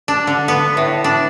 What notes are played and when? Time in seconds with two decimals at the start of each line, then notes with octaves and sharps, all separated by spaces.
0.08 D4
0.27 D3
0.48 B3
0.77 A2
1.04 D4